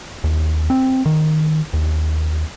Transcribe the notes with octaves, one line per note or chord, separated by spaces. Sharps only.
D#2
C4
D#3
D#2